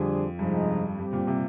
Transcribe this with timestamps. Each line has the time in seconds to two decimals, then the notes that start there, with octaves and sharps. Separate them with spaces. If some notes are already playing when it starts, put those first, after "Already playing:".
Already playing: F2 D3 G3 D4 G#4 C5
0.39 G2 C3 F3 G#3 D#4
0.98 G2 G3 C4 G4
1.13 A#2
1.27 C3